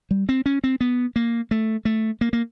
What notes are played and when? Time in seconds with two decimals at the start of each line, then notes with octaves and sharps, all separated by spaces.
0.11 G3
0.29 C4
0.46 C#4
0.64 C4
0.81 B3
1.16 A#3
1.51 A3
1.85 A3
2.21 A#3
2.33 A#3